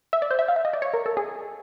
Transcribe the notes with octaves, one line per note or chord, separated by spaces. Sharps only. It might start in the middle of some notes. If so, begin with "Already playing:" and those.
E5
D5
C5
E5
F5
E5
D#5
D5
C#5
A#4
A4
G#4